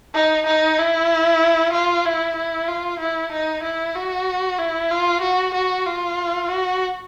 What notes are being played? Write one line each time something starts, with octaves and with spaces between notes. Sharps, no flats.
D#4
D#4
E4
F4
E4
E4
F4
E4
D#4
E4
F#4
E4
F4
F#4
F#4
F4
F#4